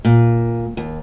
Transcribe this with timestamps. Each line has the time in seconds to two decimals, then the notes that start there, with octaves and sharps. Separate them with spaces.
0.05 A#2
0.77 D#2